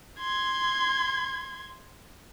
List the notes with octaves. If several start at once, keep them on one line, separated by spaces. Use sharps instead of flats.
C6 G#6